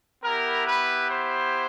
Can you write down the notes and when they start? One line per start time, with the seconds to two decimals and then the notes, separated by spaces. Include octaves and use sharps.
0.23 B3 E4 G4 A#4
0.66 B4
1.09 C5